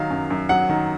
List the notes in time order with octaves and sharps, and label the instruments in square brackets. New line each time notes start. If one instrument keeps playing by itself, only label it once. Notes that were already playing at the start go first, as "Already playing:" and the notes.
Already playing: [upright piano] D#3 F#3 F5
F#2
F#2
F#3 F#5
D#3